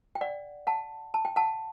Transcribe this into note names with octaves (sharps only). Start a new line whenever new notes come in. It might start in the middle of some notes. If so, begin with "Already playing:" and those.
G5
D5 F#5
F#5 A5
A5
G5
F#5 A5